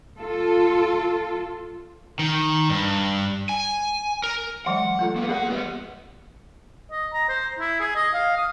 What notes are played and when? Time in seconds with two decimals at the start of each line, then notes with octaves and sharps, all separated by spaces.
0.18 F4 A4
2.19 D#3
2.70 G2
3.49 G#5
4.24 A#4
4.66 E3 F#3 G#3 F#5
4.99 A3 F4 A4
5.16 A#3 B3
5.29 A#3 G#4 A#4 F#5
5.50 G3 B3
6.91 D#5
7.13 A#5
7.29 C5
7.59 E4
7.80 G#4
7.96 D#5
8.14 F5
8.37 D#6